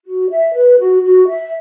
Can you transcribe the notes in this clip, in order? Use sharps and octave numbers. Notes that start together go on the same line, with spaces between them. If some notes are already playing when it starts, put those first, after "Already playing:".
F#4
E5
B4
F#4
F#4
E5